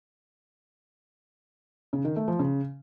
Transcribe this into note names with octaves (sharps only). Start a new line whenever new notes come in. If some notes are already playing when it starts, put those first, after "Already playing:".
C#3
D#3
A3
F3
C#3